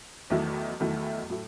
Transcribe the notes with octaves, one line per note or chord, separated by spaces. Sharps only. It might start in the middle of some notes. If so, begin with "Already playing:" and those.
E2 D#3 F#3 A3 E4
E2 D#3 F#3 A3 E4
A2 F#3 A3